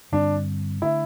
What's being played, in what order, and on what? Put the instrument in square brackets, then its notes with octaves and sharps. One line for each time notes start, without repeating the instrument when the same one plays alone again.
[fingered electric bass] G2 D3 G3 C4 [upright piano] D4
[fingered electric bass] D3 A3 D4 [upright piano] E4